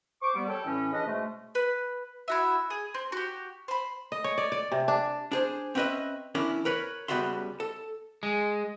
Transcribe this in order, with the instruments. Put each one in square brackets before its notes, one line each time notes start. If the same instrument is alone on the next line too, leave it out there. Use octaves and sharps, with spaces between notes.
[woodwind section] C5 C#6 D6
G3 B3
A4 C#5 G5
A2 E3 C#4
C#3 D4 B4 D#5
G#2 B2 G#3 A3
[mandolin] B4
E4 F#4 E5
G#4
C4
F#4 G4
C5 B5
[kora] D#5
C#5
D5
D5
C3
D4
[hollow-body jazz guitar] D4 G#4 C5
C4 C#4 E4 B4 D#5 E5
E3 C#4 D4 E4 A#4
A#4 B4 C#5
C#2 G3 B3 F#4 E5 C6
A4
[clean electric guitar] G#3